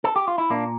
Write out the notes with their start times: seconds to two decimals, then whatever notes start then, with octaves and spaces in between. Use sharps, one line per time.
0.04 A4
0.16 G4
0.28 F4
0.38 E4
0.50 A#2 A#3 D4